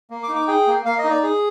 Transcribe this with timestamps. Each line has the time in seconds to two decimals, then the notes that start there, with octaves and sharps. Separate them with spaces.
0.10 A#3
0.23 D6
0.29 D#4
0.36 D6
0.48 G#4 G5
0.67 A#3
0.85 A#3 F5
0.98 D#5
1.04 D#4
1.10 D5
1.23 G#4